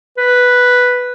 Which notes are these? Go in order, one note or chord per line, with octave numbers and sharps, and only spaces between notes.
B4